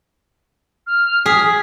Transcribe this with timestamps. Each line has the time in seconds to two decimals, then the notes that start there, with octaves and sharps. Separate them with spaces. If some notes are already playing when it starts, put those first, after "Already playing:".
0.87 F6
1.26 G#4 B6